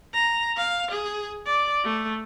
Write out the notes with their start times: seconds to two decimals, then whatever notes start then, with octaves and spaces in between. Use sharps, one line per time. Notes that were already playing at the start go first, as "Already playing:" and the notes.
0.14 A#5
0.56 F5
0.91 G#4
1.46 D5
1.84 A3